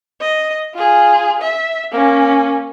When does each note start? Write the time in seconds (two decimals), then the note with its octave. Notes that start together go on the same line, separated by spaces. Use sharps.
0.20 D#5
0.74 F4 G#4
1.41 E5
1.92 A#3 C#4